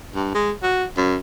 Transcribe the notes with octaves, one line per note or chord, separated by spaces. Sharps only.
G2
G#3
F#4
F#2